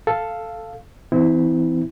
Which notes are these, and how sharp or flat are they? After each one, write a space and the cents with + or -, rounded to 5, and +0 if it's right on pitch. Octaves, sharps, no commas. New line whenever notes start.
A4 +0 F5 -5
E3 +0 C4 -35 E4 -20